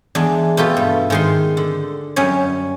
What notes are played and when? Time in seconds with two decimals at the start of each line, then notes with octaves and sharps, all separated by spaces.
0.15 E2 G#3 D4
0.57 B2 A3 F4 G4 A4
0.77 G2
1.10 G#2 D#3 C6
1.57 D3
2.16 F#2 G3 C#4 C#5